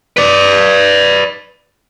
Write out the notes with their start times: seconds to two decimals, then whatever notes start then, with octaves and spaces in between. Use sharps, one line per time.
0.17 B4 D5